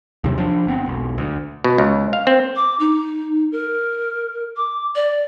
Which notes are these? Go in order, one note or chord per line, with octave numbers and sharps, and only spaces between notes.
D#2 C3 F#3
F3 D4
G1 B3 C4
E1 B1
D2
B2
C#2
F5
C4
D6
D#4
A#4
D6
D5